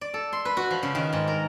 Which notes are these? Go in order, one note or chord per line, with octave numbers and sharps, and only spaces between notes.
D5
A4
C6
B4
F#4
F3
C#3
D#3
G#2
A#4